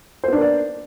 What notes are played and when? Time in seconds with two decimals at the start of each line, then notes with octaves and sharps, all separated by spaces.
0.24 C5
0.28 B3
0.33 D4
0.37 A#3
0.42 D5